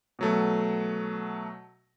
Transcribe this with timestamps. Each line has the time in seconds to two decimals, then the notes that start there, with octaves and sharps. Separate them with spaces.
0.19 B2 F#3 A3